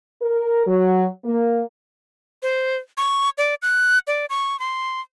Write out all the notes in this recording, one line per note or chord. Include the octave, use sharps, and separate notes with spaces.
A#4
F#3
A#3
C5
C#6
D5
F#6
D5
C#6
C6